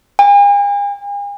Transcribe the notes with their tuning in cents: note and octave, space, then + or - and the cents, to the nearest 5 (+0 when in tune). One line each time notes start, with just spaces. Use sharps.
G#5 -45